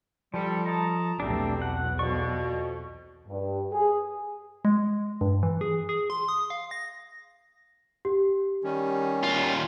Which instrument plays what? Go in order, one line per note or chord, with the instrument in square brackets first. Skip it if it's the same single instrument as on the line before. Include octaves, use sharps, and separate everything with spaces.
[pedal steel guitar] F3 A4 [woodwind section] G3
[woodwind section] D#5 A5 A#5
[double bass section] B1 E2 [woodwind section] G3 C4 [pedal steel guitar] A3 D4
[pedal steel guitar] F#5
[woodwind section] F2 B2 [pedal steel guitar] D5 C#6
[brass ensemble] G2
G#4
[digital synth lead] G#3
G2
E3
G#4
G#4
C6
D#6
F5
A#6
[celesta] G4
[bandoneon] D#3 G3 C#4
[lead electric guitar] D#2 F4